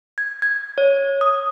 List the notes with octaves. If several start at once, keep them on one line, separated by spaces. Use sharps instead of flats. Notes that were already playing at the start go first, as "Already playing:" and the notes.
G#6
G#6
C#5
D#6